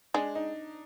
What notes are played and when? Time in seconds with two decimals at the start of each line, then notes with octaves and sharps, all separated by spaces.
0.14 G#3 D4
0.35 D#4